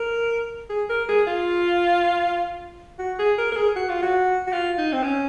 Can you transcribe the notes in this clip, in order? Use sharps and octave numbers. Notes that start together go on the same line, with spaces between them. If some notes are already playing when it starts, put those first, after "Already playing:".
Already playing: A#4
G#4
A#4
G#4
F4
F#4
G#4
A#4
A#4
G#4
F#4
F4
F#4
F#4
F4
D#4
C4
C#4